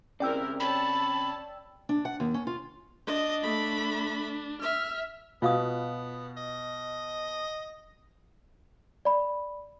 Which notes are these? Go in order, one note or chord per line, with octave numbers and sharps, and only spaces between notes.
C#3 G#3 C4 E4 A#4 D5 G5 E6
C#5 A5 B5
D4
F#5
D#2
C#4
F4
D4 D#5
A3 B5
E5 F6
B2 B3 F4 F5 D#6
D#5
D5 B5